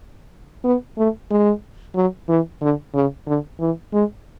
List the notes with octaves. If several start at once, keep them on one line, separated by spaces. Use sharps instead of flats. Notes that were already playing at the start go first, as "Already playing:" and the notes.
B3
A3
G#3
F#3
E3
D3
C#3
D3
E3
G#3